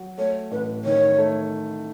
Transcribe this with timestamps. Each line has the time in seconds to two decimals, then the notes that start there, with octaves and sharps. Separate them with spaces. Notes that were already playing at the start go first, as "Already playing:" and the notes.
Already playing: F#3
0.18 A3 C#5
0.51 A1 B4
0.85 D#3 C#5
1.18 A3